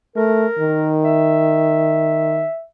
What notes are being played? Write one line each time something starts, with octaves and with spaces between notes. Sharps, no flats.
A3 A#4
D#3
E5